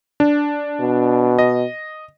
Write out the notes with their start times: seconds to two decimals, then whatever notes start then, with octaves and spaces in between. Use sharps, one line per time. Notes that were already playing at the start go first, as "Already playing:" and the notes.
0.20 D4
0.80 B2
1.39 D#5